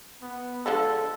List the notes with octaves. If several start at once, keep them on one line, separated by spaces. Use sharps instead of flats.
B3
D3 F3 G#3 A4